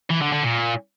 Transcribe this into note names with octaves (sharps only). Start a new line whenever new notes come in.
E3
D3
D3
A#2